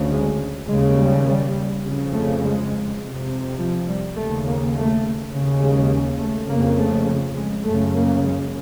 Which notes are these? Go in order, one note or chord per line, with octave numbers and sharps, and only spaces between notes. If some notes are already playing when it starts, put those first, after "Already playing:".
Already playing: D2 C#3
G#3
D#2 C#3 G#3
G3
G3
F2 C#3
A3
G#3
F2 C3
F3
G3
D#2 C#3 A3
A#3
A3
D#2 C#3
G#3
A3
F2 C#3 A#3
A3
G#3
F#2 C#3 A3
A#3
G#3